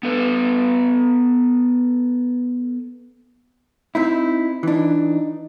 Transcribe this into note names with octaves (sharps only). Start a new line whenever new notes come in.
B3 A4 B4
C4 D#4 E4
E3 D4 D#4